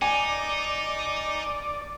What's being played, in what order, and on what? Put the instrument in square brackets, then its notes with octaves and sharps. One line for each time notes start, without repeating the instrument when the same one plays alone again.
[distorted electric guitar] D#4 [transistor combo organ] D5 [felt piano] G#5